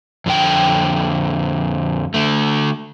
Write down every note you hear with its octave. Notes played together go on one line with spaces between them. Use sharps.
F2 D3 G5
D3 A3